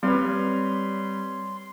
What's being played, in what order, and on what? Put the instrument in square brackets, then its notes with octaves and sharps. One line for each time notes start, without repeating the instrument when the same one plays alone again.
[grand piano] G3 B4 C#5 [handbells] C4 [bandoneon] C6